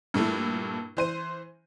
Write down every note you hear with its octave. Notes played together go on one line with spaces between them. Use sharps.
G2 A#2 A3 E4
E3 C5 D#7